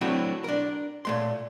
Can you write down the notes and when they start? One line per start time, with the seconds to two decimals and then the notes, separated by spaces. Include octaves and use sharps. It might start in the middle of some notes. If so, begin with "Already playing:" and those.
0.01 F#3 A3 C4 D4 E4 F#4
0.44 D4 A#4
1.05 A#2 A3 C6